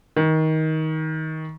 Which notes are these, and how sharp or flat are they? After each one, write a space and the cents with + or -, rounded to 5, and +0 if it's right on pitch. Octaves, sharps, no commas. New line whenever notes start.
D#3 +20